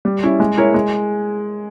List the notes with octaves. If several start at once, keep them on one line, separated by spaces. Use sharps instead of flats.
G3
C#4 E4
G#3
E4 A#4 C#5
G#3